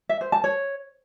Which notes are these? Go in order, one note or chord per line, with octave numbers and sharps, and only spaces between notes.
E5
C5
A5
C#5